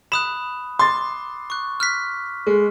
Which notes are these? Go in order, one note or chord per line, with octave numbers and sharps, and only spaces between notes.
B5 D#6 F#6 E7
C6 D6 A6
C#6 F#6
F6 F#6 B6
G#3